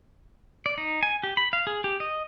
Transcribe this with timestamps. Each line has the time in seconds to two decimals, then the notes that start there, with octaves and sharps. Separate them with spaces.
0.66 D5
0.78 D#4
1.03 G#5
1.23 G4
1.37 B5
1.53 F5
1.67 G#4
1.84 G4
2.00 D#5